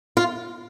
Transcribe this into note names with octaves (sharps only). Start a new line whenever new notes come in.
F4